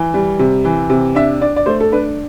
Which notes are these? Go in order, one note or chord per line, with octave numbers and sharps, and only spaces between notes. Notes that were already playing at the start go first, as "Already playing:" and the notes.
Already playing: E3
G3
C3
E3
C3
D4 E5
D4 D5
D5
A3 C5
A4
D4 B4